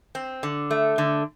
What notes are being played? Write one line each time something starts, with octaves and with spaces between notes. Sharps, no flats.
C4
D3
A3
D3